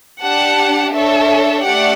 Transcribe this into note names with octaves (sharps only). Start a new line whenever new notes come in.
D4 G4 F#5 A5
D4 A4 C#5 E5
A3 D4 G4 D5 F#5